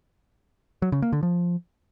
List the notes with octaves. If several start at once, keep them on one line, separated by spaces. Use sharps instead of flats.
F#3
C#3
A#3
D3
F3